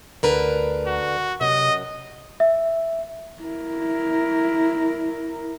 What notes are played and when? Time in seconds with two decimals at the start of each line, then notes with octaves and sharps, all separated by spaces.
0.23 D2 D3 A#4 B4
0.87 F#4
1.41 F#2 C3 D#5
2.40 E5
3.42 E4 A#4